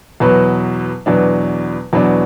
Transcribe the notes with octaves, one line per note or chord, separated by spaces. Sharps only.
E2 B2 F#3 B3
E2 B2 F#3 B3 D4
E2 B2 F#3 B3 D4